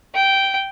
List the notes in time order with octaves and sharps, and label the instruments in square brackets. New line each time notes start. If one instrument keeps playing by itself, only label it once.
[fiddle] G5